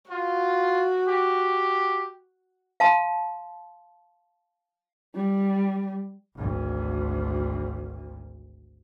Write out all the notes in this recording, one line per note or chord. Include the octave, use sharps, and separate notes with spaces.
F4 F#4
G4
F5 A5 C6
G3
G#1 D2